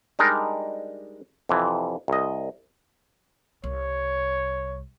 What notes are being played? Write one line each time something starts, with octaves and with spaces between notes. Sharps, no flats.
G3 G#3 D4 D#4 A#4
F2 C3 E3
C2 D#5
C2 C#5